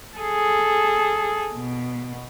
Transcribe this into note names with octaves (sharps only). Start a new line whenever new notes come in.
G#4 A4
B2